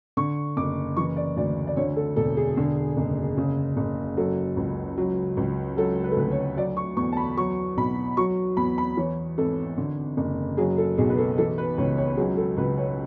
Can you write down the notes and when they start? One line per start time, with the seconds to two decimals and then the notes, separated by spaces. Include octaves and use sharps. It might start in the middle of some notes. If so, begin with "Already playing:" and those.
0.17 D3 C#6
0.57 F#1 D6
0.97 E3 C#6
1.16 D5
1.37 D2 D5
1.67 D5
1.76 D3 C#5
1.96 A4
2.16 E1 A4
2.37 G#4
2.57 D3
2.97 F#1
3.37 C#3
3.77 F#1
4.17 F#3 A4
4.57 C#2
4.97 F#3
5.37 C#2
5.77 F#3 A4
6.04 B4
6.11 A4
6.17 D2 B4
6.31 C#5
6.57 F#3 D5
6.77 C#6
6.97 E2 C#6
7.12 A5
7.17 B5
7.37 F#3 C#6
7.77 B1 B5
8.17 F#3 C#6
8.57 E2 B5
8.78 B5
8.97 E3 C#5
9.38 G#1 A4
9.78 D3
10.17 F#1
10.57 F#3 G#4
10.78 A4
10.98 B1 G#4
11.09 B4
11.18 A4
11.38 E3 A4
11.58 B4
11.78 C#2 C#5
11.97 C#5
12.17 F#3 G#4
12.37 A4
12.57 C#2 B4
12.78 C#5